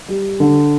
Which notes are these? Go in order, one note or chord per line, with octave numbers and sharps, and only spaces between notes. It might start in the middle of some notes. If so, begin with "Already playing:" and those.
G3
D3